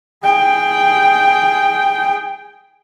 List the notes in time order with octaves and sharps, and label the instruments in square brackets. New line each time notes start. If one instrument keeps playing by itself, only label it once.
[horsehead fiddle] G#4 G5